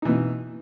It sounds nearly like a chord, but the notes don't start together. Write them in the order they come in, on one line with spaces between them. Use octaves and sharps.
D#4 E3 B2